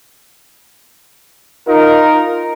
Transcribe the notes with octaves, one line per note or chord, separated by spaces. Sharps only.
D#4 F4 A#4